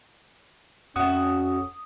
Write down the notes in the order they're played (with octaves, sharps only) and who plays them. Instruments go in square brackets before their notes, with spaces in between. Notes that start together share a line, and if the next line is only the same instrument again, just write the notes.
[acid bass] F2 [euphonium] C#4 [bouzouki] F#4 E5 [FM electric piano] D#6